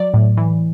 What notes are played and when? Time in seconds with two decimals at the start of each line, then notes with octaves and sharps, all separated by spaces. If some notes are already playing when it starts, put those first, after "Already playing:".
Already playing: F#3 D5
0.14 A2
0.37 E3